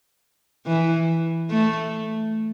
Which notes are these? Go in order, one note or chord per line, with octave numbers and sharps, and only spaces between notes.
E3
A3